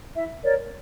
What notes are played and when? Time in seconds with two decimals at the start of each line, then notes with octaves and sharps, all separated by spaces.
0.14 E4 E5
0.43 A#4 C#5 D5